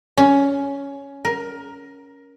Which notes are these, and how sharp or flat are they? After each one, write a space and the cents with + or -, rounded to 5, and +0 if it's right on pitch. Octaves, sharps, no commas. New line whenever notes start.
C#4 +10
A#4 +15